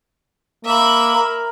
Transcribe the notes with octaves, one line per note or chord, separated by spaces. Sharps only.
A#3 E5 B5
A#4